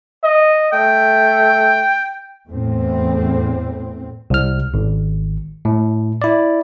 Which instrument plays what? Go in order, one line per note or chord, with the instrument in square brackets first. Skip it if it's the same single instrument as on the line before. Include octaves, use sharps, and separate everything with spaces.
[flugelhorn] D#5
[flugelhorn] A3 [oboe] G5
[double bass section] E2 A2 C4
[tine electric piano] C2 F6
G#1
A2
E4 D5